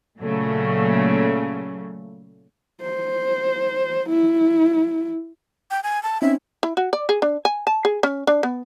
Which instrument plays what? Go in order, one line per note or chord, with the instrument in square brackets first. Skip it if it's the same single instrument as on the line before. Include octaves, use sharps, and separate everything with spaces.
[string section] A#2 C#3 F#3 A3
[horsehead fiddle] C5
E4
[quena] G5
G#5
A5
[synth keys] C4 C#4 D#4 [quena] E5
[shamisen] E4
F#4
D5
G#4
D4
G#5
A5
G#4
C#4
D4
B3